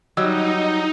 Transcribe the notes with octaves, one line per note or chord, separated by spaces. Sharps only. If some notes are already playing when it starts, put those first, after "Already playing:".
F#3 G3 D#4 D#5 E6